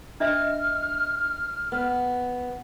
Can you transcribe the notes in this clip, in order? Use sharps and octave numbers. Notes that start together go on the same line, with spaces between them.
D4 D#5 E5 F6
B3